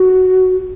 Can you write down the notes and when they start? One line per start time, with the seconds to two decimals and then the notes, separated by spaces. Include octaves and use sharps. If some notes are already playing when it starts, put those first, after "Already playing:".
Already playing: F#4